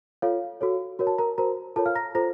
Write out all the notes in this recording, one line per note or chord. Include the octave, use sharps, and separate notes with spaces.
F4 A4 C#5 F5
F#4 A4 C#5
F#4 A#4 C#5
A5
A#4 A#5
F#4 A#4 C5 A#5
F4 A4 A#4 C#5 A5
F5 F6
A#5 A#6
F4 A4 C5 A#5 A#6